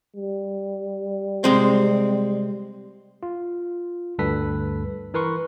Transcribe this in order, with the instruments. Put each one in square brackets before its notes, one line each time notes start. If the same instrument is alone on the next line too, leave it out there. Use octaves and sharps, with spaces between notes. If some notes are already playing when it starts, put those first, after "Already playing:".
[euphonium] G3
[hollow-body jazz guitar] C3 G#3 C4
[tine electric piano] F4
D2 G2 A4 B4 B6
E3 A#4 B4 C6 C#6